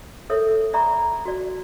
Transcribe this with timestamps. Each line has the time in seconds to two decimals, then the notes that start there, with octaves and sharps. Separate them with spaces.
0.30 A4 A#4 C#5 E5
0.73 D5 E5 A#5 B5 C#6
1.25 F#4 D5